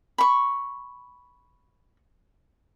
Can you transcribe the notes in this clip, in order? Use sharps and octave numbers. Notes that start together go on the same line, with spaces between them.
B5 C#6